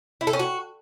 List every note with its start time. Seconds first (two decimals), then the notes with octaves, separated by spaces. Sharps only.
0.21 E4
0.27 A4
0.33 C#4
0.39 F#4